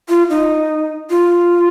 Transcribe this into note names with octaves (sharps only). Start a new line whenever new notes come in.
F4
D#4
F4